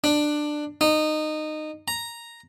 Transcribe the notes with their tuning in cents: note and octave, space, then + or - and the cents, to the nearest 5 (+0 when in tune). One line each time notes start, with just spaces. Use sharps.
D4 +15
D#4 -20
A#5 +0